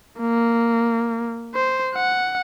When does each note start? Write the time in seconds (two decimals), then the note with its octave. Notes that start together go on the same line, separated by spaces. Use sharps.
0.20 A#3
1.55 C5
1.95 F#5